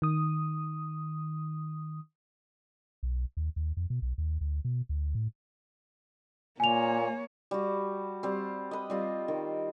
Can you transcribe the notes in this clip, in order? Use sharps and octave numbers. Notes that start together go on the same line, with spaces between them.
D#3 D#6
B1
D#2
D#2
F2
B2
B1
D#2
D2
B2
D2
A2
A#2 A#3 C#5 G#5 F7
G3 F#4
G3 C4
B4 D#5
G3 C4 F4
D#3